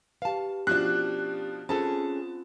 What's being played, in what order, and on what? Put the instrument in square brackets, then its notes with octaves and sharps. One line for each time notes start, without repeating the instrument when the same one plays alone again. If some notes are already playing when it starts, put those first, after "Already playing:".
[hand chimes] G4 B4 [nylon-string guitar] F5 A5
[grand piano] B2 F3 D4 [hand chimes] C#4 G4 [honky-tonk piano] F#6
[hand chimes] C4 F4 C5 [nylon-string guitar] C#4 G#4 A4 [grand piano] A5